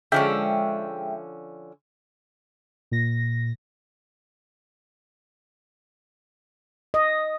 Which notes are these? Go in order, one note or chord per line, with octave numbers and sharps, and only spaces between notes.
D3 F3 G#3 C#4 E5 G5
A#2 A#6
D#5